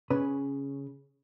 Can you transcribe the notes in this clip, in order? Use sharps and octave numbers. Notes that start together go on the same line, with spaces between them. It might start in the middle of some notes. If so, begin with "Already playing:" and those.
C#3 C#4 B4